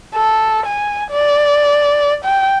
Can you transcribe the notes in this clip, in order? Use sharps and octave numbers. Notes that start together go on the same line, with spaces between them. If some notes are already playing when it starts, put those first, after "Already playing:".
A4
G#5
D5
G5